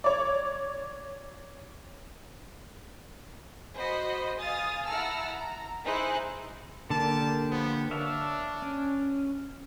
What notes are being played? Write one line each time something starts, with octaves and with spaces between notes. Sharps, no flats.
C#5 D5
F#4 C5 D#5 B5
F5 G#5 D#6 A6
E4 F#5 A5 A#5 E6 F6
A#5
D#4 E4 G#4 C5 G#5 F#6
D3 A#3 G4 A#4 D5 A5
F3 B3
D4 C#5 E5 F5
C#4